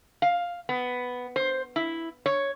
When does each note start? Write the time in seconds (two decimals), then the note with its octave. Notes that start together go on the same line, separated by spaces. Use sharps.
0.22 F5
0.69 B3
1.36 C5
1.76 E4
2.26 C#5